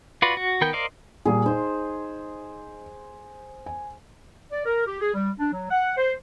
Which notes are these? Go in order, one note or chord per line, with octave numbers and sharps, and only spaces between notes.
F4 F#4 B4 D5
F#4
D#3 B3 A#4 G5 G6
A#4 C5 D5 D#5 F5
A#2 G3 A#3 G#4
D#4 C5
G#5
D5
A#4
G4
G#4
G3
D4
F#3
F#5
C5